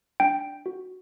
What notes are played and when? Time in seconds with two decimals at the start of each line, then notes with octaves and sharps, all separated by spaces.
0.20 D4 G5
0.66 F#4